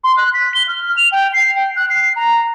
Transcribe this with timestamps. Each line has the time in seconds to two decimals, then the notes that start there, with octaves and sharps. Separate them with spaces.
0.04 C6
0.17 F#6
0.34 B6
0.55 G7
0.68 F6
0.97 F7
1.12 G5
1.33 C7
1.56 G5
1.76 F#6
1.90 C7
2.16 A#5